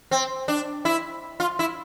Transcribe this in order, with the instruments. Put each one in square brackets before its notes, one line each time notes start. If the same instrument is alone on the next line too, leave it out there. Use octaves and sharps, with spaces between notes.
[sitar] C4
D4
E4
F4
E4